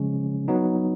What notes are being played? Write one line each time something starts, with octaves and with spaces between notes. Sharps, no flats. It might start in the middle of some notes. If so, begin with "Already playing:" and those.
Already playing: C#3 F3 G#3 C#4
F#3 B3 D#4